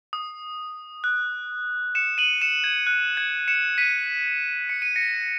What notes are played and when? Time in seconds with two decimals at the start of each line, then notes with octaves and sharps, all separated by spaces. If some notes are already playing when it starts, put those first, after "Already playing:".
0.13 D#6
1.04 F#6
1.95 C#7 E7
2.18 D#7 F#7
2.41 C#7 E7
2.64 G#6
2.87 F#6
3.17 G#6
3.48 C#7 E7
3.78 B6 D#7
4.69 C#7
4.82 D#7
4.96 A#6 C#7